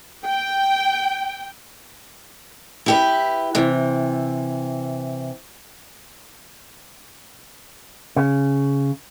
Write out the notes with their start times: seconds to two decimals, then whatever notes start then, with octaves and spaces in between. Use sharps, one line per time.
0.24 G5
2.86 E4 G4 B4
3.55 C3 E3
8.16 C#3